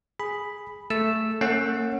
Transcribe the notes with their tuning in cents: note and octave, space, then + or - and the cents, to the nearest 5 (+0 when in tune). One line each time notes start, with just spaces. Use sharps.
G#4 +0 B5 +0
A3 +0 E6 +0
A#3 -35 C#4 -20 F#5 +0